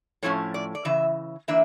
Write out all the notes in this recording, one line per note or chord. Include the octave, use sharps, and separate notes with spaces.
A2 F3 A3 C#4 C#5
D5
D5
C#3 E3 E5
E3 A#3 D4 E5